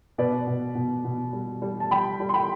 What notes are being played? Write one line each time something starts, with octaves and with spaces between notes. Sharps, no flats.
B2 B4 D5
B2
B2
B2
G3
G3
A5
G3 G5 B5
G3
C6
G5 B5